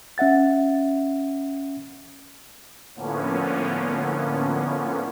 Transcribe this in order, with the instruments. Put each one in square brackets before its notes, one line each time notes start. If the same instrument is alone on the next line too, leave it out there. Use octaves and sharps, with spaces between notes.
[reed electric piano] C#4 E5 F#5 A6
[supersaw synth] A2 D3 F3 A#3 B3 C#4